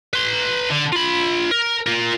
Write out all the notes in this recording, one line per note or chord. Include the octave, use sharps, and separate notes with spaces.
B4 C6
D3
F4 B5
A#4
F4 A#4